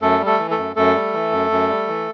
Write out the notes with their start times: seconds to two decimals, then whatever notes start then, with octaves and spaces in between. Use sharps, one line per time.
0.01 F#2 A3 A4
0.19 G3
0.26 A3 A4
0.39 E3
0.51 A3 A4
0.57 F#2
0.76 F#2 A3 A4
0.95 G3
1.14 E3
1.32 F#2
1.51 F#2
1.70 G3
1.88 E3